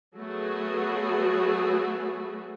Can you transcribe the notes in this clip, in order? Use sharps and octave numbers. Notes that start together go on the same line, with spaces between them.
F#3 A3 B3 F#4 G#4